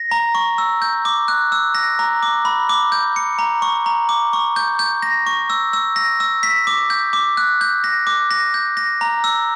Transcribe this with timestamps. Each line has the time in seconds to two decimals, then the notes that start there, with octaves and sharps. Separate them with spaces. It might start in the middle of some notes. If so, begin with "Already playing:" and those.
Already playing: A#6
0.11 A#5
0.35 C#6
0.58 E6
0.82 G6
1.05 D6
1.28 F#6
1.52 E6
1.75 A#6
1.99 A#5
2.23 D6
2.45 B5
2.69 D6
2.92 G6
3.16 C#7
3.39 A#5
3.62 C#6
3.86 A#5
4.09 D6
4.33 C#6
4.56 G6
4.79 G6
5.02 A#6
5.27 C#6
5.50 E6
5.73 E6
5.96 A#6
6.20 E6
6.43 B6
6.67 D6
6.90 G6
7.13 D6
7.37 F#6
7.61 G6
7.84 A#6
8.07 D6
8.31 A#6
8.54 G6
8.77 A#6
9.01 A#5
9.24 E6